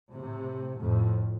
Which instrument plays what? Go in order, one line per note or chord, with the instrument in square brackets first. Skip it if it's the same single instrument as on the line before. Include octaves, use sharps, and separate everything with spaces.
[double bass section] A2 C3
F2 A2